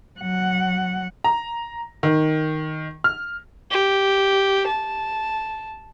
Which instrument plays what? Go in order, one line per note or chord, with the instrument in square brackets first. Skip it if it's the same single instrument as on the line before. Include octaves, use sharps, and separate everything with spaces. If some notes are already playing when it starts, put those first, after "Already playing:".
[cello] F#3 F#5
[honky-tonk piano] A#5
D#3
F6
[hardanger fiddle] G4
A5